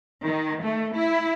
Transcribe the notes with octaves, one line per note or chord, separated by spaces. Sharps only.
D#3
A3
E4